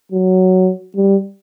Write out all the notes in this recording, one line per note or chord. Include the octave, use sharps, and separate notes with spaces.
F#3
G3